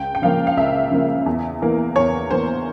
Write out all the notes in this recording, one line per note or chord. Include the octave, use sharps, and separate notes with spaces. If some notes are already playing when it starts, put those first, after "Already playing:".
Already playing: C#2 G5
G5
C#3 F3 A#3 F5
F5
C#2 E5
C#3 F3 A#3
E2
E3 A#3
E2 C#5
E3 A#3 C5